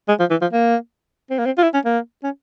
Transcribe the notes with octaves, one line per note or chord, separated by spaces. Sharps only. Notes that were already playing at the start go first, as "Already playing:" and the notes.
G#3
F3
E3
F3
A#3
C4
A#3
C4
F4
E4
C#4
A#3
C#4